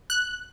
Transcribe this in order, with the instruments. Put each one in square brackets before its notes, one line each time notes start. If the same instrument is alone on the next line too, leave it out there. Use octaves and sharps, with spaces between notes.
[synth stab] F#6